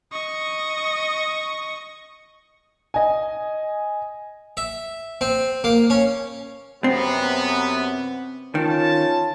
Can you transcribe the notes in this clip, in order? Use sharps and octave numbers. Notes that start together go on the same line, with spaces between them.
D#5 C#6
D#5 G#5
E5
C4
A#3
C#4
F#2 C3 B3 C4
D#3 C#4 F4 A5